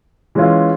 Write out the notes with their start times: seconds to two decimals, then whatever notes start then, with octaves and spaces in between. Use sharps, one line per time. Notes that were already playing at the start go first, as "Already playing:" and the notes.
0.35 E3 G#3 C#4 F4